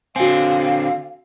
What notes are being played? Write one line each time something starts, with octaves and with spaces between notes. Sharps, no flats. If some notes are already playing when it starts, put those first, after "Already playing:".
D3 C4 F#4 F5 G#5